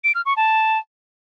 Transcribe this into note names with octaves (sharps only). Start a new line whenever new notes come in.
D7
F6
C#6
A5